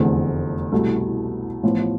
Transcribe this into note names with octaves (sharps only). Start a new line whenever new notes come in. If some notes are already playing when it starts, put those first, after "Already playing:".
Already playing: F1 E2 D3 A3 C4
C2 B2 A3 E4
A1 A2 F3 B3